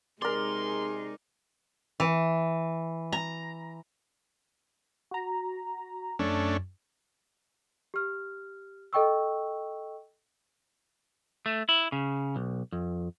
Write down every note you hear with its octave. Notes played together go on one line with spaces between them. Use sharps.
C3 G#3 D#4 G#4 A#4 D5 C6
E3
A#5
F#4 A#5
F#2 A3 C#4 D4
G4 F6
A4 D#5 G5 C#6 E6
A3
E4
C#3
B1
F2